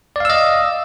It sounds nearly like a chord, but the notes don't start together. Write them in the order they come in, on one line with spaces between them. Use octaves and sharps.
D5 F5 E6 D#5